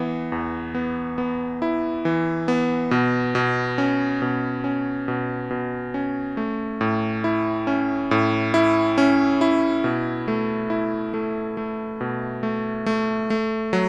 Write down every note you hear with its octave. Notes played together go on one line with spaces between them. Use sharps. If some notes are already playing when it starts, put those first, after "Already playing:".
Already playing: E3 B3
E2
B3
B3
E4
E3
B3
B2
B2
C#4
B2
C#4
B2
B2
C#4
A3
A2
E4
C#4
A2
E4
C#4
E4
B2
A3
E4
A3
A3
B2
A3
A3
A3
F#3